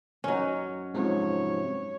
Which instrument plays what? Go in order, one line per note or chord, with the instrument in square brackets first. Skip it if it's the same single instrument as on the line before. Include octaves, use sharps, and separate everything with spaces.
[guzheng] F#2 D#4 [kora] F#3 C#4
[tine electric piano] G#2 C3 F3 [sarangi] C#5